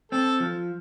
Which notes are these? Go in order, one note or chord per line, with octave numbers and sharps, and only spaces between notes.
C4 A4
F3